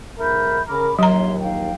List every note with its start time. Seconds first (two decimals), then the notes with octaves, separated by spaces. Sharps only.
0.19 B1 G#2 A#4 E5 B5 G6
0.67 C#3 A#4 B5 D6
0.99 A#1 D#2 F#3 C#5 E5 A#5 C6
1.41 D#4 F5 G5